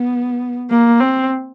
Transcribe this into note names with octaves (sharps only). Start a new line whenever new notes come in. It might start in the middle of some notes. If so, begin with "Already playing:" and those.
Already playing: B3
A#3
C4